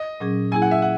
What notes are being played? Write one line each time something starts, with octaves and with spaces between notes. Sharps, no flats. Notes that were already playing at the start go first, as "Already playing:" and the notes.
Already playing: D#5
A#2 F#3 C#4 G#4
F#3 A#3 E4 G#4 G#5
F#5
E5
F#5